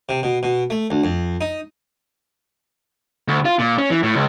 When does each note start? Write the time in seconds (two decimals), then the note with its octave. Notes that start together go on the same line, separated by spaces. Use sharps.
0.09 C3
0.23 B2
0.43 B2
0.70 A3
0.90 D2
1.04 F2
1.41 D#4
3.28 D2
3.45 F4
3.59 A#2
3.78 C#4
3.90 E3
4.03 A2
4.15 C#2